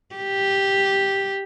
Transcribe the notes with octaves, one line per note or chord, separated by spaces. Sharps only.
G4